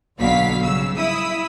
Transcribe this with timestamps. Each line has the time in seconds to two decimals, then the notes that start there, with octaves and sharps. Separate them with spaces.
0.18 B1 B2 D3 F#3 F5 B6
0.63 G2 C#3 E6
0.96 E4 D#6 E6 B6